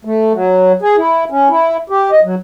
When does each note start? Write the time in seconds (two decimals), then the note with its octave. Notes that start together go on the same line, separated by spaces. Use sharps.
0.05 A3
0.33 F#3
0.82 G#4
0.97 E4
1.30 C#4
1.50 E4
1.90 G4
2.12 D#5
2.24 F#3